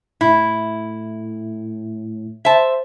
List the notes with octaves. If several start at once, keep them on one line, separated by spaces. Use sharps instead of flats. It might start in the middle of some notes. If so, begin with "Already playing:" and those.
A2 E4
C5 E5 A5